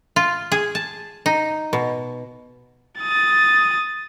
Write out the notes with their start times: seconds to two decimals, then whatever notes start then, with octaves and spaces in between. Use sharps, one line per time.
0.16 F4
0.52 G#4
0.75 A5
1.26 D#4
1.73 B2
3.01 D#6 A6